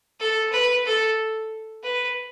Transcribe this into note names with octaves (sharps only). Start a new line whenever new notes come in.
A4
B4
A4
B4